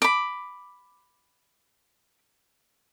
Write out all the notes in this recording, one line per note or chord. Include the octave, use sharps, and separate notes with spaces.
B5 D6